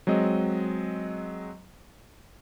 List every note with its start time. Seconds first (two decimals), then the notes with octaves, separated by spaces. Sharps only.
0.07 F#3 G#3 C4 D#5